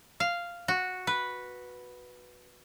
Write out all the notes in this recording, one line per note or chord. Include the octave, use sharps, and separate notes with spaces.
F5
F#4
B4